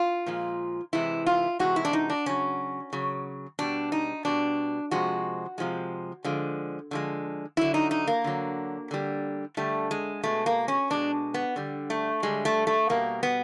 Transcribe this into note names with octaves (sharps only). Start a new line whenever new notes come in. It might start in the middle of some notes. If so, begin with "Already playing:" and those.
Already playing: F4
A#2 F3 G#3
C3 E3 G#3 E4
F4
C3 E3 G#3 F#4
E4
D4
D#4
D4
C#3 F#3 C#4
C#3 F#3
B2 G3 D4
D#4
B2 G3 D4
C3 F3 G#3 F#4
C3 F3 G#3
D3 F3 G#3
D3 F3 G#3
D3 F#3 E4
D#4
D#4
A#3
D3 F#3
D3 G3
D3 G3 A3
G#3
B2 G#3 A3
A#3
C#4
B2 G#3 D4
B3
D3 G3
A3
D3 G3 G#3
A3
A3
B2 G3 A#3
B3